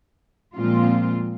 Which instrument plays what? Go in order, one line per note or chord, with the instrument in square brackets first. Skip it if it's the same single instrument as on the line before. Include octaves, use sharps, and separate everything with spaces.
[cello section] A#2 F3 G#3 C4 F4